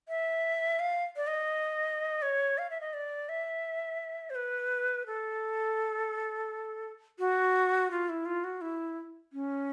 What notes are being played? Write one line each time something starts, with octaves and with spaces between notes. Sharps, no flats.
E5
F5
D5
D#5
C#5
F5
E5
D#5
D5
E5
C5
B4
A4
F#4
F4
E4
F4
F#4
E4
C#4